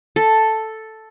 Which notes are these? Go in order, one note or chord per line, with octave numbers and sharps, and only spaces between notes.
A4